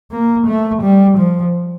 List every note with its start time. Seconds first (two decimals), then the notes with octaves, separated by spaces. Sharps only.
0.11 A#3
0.47 A3
0.82 G3
1.17 F3